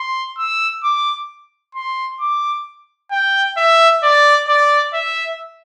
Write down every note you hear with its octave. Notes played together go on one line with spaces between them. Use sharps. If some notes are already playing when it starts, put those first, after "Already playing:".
Already playing: C6
E6
D6
C6
D6
G5
E5
D5
D5
E5